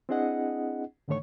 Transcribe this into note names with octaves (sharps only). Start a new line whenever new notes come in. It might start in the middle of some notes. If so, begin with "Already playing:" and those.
C4 D4 E4 G#4 D#5 F#5
G#2 D3 D#3 A3 C#5 C#6